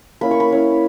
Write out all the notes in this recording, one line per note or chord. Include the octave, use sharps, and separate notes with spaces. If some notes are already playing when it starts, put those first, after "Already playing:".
A#3 C#4 E4 B5
C#6
B5
A#3 C#4 E4